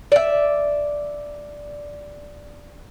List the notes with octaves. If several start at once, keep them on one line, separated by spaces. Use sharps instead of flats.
D5 E5